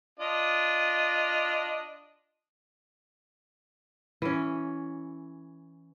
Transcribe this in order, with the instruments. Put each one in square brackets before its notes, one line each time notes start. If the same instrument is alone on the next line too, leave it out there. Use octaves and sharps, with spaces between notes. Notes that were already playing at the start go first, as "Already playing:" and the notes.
[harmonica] D4 F4 D#5
[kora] E3 C#4